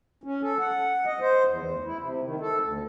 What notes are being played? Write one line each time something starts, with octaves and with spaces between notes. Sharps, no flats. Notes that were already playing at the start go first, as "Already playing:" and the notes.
C#4
A4
F#5
D#5
C5
E2
D2
E4
C3
D#3
A4
D2